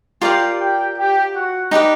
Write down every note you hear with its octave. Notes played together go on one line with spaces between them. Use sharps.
F4 G4 A#4 D5 F5 G5
G4 G5
G4 G5
F#4 F#5
D#4 G4 B4 D5